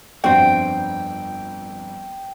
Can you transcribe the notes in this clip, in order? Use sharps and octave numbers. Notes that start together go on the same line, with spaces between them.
G1 F2 C4 D4 F#4 G5